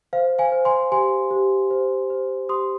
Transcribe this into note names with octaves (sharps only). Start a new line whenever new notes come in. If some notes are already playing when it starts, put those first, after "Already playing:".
C5 F5
F5 G#5
C5
G#5 C6
G4 G#5 C6
G4
C5
C5
G4 C6 D#6